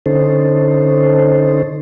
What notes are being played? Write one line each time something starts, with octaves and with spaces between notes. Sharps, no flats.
D3 C#4 D#4 A4 C5